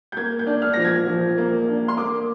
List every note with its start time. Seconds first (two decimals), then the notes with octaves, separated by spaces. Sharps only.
0.12 G6
0.17 A#3 G#6
0.39 G6
0.47 D4
0.62 F6
0.73 F3 A#6
0.85 G#6
1.07 F3
1.38 A#3
1.68 D4
1.88 C6
1.97 A#3 D6